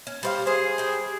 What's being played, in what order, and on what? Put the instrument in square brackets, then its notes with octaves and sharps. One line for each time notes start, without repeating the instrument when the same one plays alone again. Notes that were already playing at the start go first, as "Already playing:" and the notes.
[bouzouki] C#4
G3 C5 F5
[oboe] G#4 [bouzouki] C5
[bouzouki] G3 G5